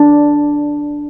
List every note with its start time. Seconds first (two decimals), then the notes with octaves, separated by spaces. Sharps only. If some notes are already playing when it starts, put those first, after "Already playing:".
Already playing: D4